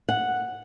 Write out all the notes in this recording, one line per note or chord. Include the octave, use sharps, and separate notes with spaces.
F#5